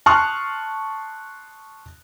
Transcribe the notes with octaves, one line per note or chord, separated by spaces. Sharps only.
A5 C6 C#6 D#6 F6 F#6